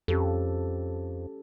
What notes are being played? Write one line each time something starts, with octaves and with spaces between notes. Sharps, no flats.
F2 C#4 G4 A4